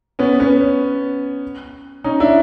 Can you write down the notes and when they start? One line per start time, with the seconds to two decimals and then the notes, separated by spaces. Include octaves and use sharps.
0.19 B3 C#4
0.40 B3 C#4
2.04 C#4 D#4
2.20 D4 E4